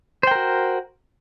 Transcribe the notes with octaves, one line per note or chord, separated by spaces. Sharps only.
F#4 A#4 C5 G5